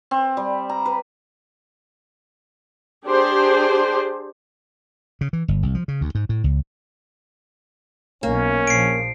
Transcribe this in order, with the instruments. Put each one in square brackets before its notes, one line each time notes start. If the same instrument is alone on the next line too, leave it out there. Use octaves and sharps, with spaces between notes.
[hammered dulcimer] C4
G3
A#5
B4
[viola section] D4 G4 G#4 C5
[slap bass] C#3
E3
G1
C2
F3
C#3
D2
G#2
A2
C#2
[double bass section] B1 [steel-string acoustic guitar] A#3 [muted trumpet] C#4
[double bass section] A#1 F3 [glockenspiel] C7 D7